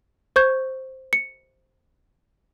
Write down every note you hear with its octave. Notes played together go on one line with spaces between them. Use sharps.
C5 C#6 G6 G#6
C#7